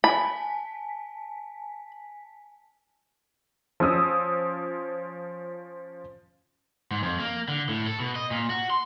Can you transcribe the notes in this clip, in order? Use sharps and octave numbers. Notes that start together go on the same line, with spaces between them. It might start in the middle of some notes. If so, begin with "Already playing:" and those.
G#5 A5 B5 B6
F3 C#4 D#6 E6
G#2
F2
A#3
D3
A2
A4
B2
D#5
A#2
F#4
C6